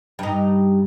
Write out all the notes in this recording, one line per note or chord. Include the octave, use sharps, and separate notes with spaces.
G2 D#4